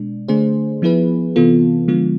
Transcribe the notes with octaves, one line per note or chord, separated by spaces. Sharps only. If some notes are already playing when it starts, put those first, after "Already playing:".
Already playing: B2 G#3 D4
D3 A3 D4 G#4 C5
F3 B3 E4 G#4 B4
C3 E3 B3 F4 A4
D3 F3 G#3 B3 F4